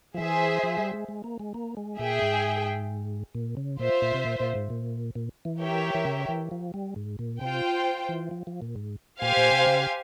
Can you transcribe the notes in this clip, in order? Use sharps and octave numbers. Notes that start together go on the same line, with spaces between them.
F3
E3 G#4 C5 E5
F3
G3
G#3
G#3
A#3
G#3
A#3
G#3
A#2 G#4 E5 G5
G#2
A#2
C#3
A#2 F4 C5 E5
A#2
C3
A#2
A#2
G#2
A#2
A#2
E3
G4 A#4 C#5 E5 G5
E3
C#3
E3
F3
G3
G#2
A#2
C3 F4 C5 G5
E3
F3
F3
A#2
G#2
A#2 G4 C5 F5 G#5
A#2
C3
C#3